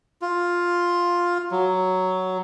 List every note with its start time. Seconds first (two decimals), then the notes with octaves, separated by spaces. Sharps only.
0.22 F4
1.51 F#3